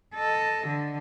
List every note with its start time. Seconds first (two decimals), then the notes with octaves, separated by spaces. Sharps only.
0.15 A4 D#5
0.67 D3